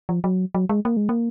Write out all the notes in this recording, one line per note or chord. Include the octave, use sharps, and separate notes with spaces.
F3
F#3
F#3
G#3
A#3
G#3
A#3